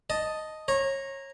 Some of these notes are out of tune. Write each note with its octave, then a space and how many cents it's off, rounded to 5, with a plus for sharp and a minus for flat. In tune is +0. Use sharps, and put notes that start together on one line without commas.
D#5 +0 A5 +0
C#5 -25 A#5 +0